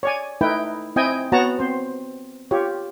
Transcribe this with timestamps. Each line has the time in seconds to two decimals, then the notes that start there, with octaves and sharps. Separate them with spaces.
0.03 C#5 D5 G#5
0.41 A3 D#4 E4 B4 G5
0.96 C4 E4 D#5 G5 G#5
1.32 B3 F#4 C#5 F#5 A5 A#5
1.59 C4 C5
2.51 F4 G4 C#5